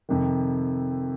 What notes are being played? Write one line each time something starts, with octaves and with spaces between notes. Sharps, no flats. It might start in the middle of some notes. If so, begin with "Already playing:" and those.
F2 C3 D#3